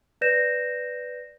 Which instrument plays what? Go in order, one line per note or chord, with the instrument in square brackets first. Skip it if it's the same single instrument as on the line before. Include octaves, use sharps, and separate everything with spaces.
[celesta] B4 D5 G6 A#6 E7